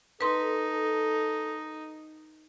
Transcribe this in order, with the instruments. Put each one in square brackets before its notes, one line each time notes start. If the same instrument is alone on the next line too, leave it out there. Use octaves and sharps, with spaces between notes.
[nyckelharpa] D#4 [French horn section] A4 [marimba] B4 C6